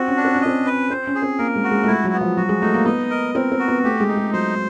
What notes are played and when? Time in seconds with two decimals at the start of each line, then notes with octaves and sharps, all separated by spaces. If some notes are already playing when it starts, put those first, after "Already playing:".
Already playing: C4 F#4
0.08 C#4
0.17 D4
0.25 C4
0.35 C#4
0.42 C4 D#5
0.66 B4
0.90 C4 C5
1.07 C#4
1.15 G#4
1.22 C4
1.39 A#3 A#4
1.56 G#3
1.64 F#4
1.71 G#3
1.83 A3
1.88 G#3 E4
2.04 F#3
2.13 B3
2.21 F3
2.37 F#3 F#4
2.49 G#3
2.62 A3 D#4
2.74 A#3
2.85 B3 D#5
3.10 A#4
3.35 C4 A#4
3.52 C4
3.60 F#4
3.68 B3
3.84 A3 G4
4.00 G#3
4.09 D#4
4.17 G#3
4.33 F#3 C5